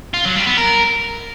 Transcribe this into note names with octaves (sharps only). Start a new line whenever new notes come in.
F4
F#3
G3
B3
A#4